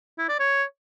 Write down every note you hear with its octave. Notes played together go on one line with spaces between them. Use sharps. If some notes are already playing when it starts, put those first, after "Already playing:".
E4
D5
C#5